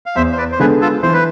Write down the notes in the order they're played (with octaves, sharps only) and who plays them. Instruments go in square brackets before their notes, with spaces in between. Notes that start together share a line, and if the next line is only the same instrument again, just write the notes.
[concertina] F5
[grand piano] E2 [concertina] C5 E5
[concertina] C5
B4 D5
C5
[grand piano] D3 G#3 B3 [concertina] G#4 B4
[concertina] F4 A4
[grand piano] E3 [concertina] C5
[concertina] B4